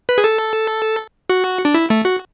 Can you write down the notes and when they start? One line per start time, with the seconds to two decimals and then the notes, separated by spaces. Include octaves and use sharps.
0.09 B4
0.18 G#4
0.24 A4
1.30 F#4
1.65 D4
1.74 E4
1.90 A3
2.05 F#4